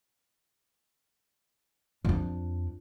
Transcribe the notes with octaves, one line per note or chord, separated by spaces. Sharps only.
F2 D4